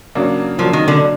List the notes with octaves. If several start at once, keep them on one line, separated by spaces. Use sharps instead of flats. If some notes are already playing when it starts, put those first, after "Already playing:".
C#3 F#3 A#3 D4
C#3 F3 F#3 A#3 D4
D#3
D3